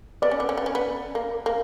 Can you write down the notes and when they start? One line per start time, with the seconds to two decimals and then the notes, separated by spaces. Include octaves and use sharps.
0.22 B3 D5
0.31 C#4
0.40 B3
0.49 C#4
0.57 B3
0.66 C#4
0.75 B3
1.15 A#3
1.46 A#3